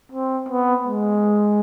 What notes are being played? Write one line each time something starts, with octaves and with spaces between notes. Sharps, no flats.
C4
B3
G#3